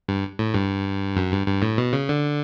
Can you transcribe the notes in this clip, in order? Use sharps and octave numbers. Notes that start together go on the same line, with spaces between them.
G2
A2
G2
F#2
G2
G2
A2
B2
C#3
D3